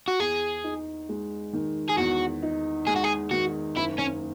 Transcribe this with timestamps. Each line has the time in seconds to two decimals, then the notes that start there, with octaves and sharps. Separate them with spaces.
0.08 F#4
0.19 E2 G#4
0.64 D#4
1.09 G#3
1.53 D#3
1.89 G#4
1.98 E2 F#4
2.43 D#4
2.87 G#3 G#4
2.96 F#4
3.04 G#4
3.31 D#3 F#4
3.76 F#1 E4
3.98 C#4